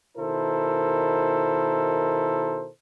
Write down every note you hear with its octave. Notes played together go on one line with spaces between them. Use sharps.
B2 D#3 E4 A4 A#4 C5